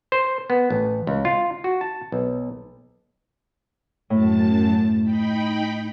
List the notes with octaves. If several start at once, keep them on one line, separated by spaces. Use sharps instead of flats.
C5
B3
A1
C#2
F4
F#4
A5
B1
F#2 A2 A5
D#4 G5 B5